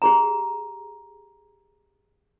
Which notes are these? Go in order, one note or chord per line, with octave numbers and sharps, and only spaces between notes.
G4 G#4 A#5